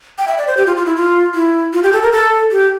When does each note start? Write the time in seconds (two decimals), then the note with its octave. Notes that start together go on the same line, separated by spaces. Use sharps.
0.18 G5
0.28 E5
0.38 D5
0.47 C5
0.57 G4
0.66 F4
0.77 F4
0.86 E4
0.96 F4
1.34 E4
1.73 F4
1.83 G4
1.93 A4
2.02 A#4
2.12 A4
2.51 G4